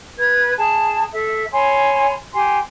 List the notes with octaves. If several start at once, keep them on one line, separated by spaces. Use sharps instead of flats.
B4 G#6
G#4 A5
A4 E5
C#5 G#5 B5 C6
G4 G#5 C6